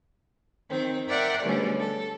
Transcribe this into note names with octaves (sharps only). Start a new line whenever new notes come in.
D#3 C4
A#4 D5 E5 F#5 G5 C6
G#2 B2 D3 G3 A3 C#4
A4